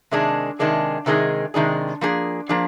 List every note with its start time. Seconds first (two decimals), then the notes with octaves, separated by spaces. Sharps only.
0.11 C3 D#3 G#3 D4 G#4
0.59 C3 D#3 G#3 D4 G#4
1.06 C3 D#3 G#3 D4 G#4
1.54 C3 D#3 G#3 D4 G#4
2.01 F3 A#3 D4 G#4
2.49 F3 A#3 D4 G#4